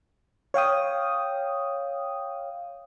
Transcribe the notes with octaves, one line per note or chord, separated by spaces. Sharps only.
C#5 F5 G5 D#6